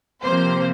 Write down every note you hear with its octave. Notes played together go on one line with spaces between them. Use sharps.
C3 F3 A#3 C5